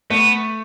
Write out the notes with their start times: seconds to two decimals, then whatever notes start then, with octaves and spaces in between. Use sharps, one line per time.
0.10 A3 B3